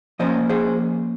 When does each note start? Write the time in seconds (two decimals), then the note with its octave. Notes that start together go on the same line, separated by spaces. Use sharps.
0.19 F3 A#3 C#4 C5 D#5
0.49 G#4 C5